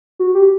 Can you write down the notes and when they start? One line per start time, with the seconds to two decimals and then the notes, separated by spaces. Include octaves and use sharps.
0.19 F#4
0.35 G4